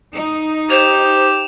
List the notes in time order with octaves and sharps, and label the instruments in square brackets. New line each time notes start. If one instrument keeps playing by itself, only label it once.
[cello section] D#4
[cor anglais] G4 [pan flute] C5 [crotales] E7 F7